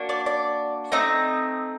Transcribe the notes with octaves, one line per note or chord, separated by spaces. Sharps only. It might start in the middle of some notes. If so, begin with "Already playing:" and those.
Already playing: A#3 D4 F#4
D5
D5
A3 C4 D#4 D#5